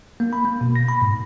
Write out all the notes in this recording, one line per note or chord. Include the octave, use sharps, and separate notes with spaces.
A#3
B5
A#3
B2
A#6
B5
G#2